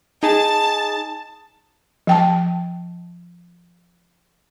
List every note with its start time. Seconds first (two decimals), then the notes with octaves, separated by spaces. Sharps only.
0.23 D#4 G#4 A5
2.07 F3 G5 A5